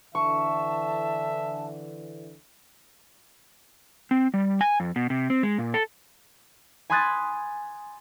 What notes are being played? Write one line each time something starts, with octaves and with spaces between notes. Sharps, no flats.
D3 E3 E5 A5 C#6
C4
G3
G#5
F2
B2
C3
C4
G#3
A#2
A4
G#5 B5 C6 D#6 F#6 A6